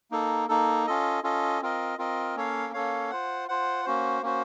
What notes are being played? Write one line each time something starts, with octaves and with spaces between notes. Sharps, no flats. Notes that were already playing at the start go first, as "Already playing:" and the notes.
A#3 D#4 A4
A#3 D#4 A4
C#4 F4 A4 D#5
C#4 F4 A4 D#5
C4 F4 A#4 D#5
C4 F4 A#4 D#5
A#3 C#4 A4 C#5 F5
A#3 C#4 A4 C#5 F5
F4 C5 F#5
F4 C5 F#5
A#3 C#4 F#4 C5
A#3 C#4 F#4 C5